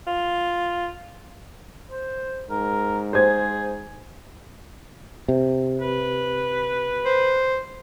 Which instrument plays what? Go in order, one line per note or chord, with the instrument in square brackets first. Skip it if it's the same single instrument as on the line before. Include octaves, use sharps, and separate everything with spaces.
[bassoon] F4
[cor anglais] C5
[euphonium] G#2 [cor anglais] A#4
[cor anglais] G#4 [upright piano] C5 G#6
[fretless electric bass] C3
[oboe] B4
[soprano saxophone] C5